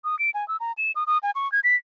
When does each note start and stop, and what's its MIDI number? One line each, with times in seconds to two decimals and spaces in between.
0.04 0.18 87
0.19 0.30 98
0.34 0.47 80
0.48 0.57 88
0.60 0.72 82
0.78 0.92 100
0.96 1.04 87
1.07 1.18 87
1.23 1.31 80
1.35 1.50 85
1.52 1.60 92
1.64 1.76 95